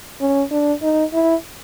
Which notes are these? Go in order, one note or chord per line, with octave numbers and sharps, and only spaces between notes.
C#4
D4
D#4
E4